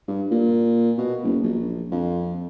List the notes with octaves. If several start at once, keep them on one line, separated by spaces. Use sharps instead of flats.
G2
A#2
B2
F#1
A#1
F2